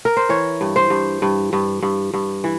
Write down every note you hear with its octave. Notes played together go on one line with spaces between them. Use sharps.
A#4
C5
E3 C#5
G2
C5
G2
G2
G2
G2
G2
E3